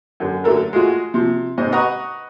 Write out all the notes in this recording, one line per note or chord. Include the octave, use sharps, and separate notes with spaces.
F#2 D3
D3 F#3 A3 A4 A#4
G#3 A3 F4 F#4
C3 F3
G#2 C3 C5 D#5
B4 D#5 F#5 A#5 C#6